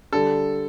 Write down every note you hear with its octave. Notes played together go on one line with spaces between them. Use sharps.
D3 G3 A4